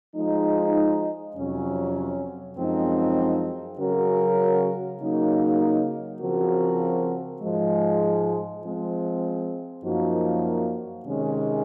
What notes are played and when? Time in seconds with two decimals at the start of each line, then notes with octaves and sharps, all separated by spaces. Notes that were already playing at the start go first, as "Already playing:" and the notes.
0.13 F3 G#3 D#4
1.34 F2 C3 F#3 C#4
2.56 F#2 F3 G#3 C4 D#4
3.78 C#3 F#3 C#4 F#4 A#4
4.99 C#3 F#3 A#3 D#4
6.19 C#3 F3 C4 F#4 A#4
7.41 G#2 F3 G#3
8.62 F3 G#3 C4
9.83 F#2 F3 A#3 D#4 F#4
11.04 C3 D#3 G#3 C#4